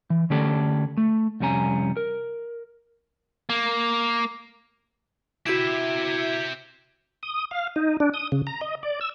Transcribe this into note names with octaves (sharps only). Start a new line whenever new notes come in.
E3
D3 A3 C#4 G4 A4 D5
A3
C2 F2 G3 C#4 G#5 A#5
A#4
A#3
E4 F#4 G4 E5 B6 D7
D#6
F5
D#4
D4
D#6
C#3
A#5
D#5
D5
E6